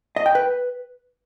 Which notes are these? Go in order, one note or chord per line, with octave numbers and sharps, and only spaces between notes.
D#5
G5
B4